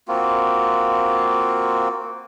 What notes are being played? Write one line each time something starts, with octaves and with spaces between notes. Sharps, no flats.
A#3 C4 F4 F#4